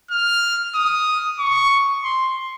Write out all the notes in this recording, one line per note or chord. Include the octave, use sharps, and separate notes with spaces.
F6
D#6
C#6
C6